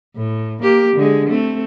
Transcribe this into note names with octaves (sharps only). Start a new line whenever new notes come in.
A2
A#3 G4
D3 G#3
A3 C4